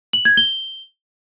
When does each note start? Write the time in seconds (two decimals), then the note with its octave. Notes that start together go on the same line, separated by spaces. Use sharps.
0.13 F#7
0.25 G#6
0.37 G7